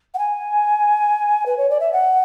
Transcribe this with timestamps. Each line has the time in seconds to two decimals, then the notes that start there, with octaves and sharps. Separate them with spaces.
0.14 F#5
0.18 G#5
1.45 B4
1.57 C#5
1.69 D5
1.80 E5
1.92 F#5